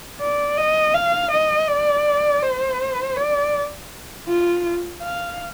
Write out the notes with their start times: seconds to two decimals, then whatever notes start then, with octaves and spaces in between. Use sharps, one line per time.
0.20 D5
0.57 D#5
0.94 F5
1.31 D#5
1.68 D5
2.42 C5
3.17 D5
4.28 F4
5.02 F5